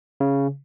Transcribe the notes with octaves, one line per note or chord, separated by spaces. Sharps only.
C#3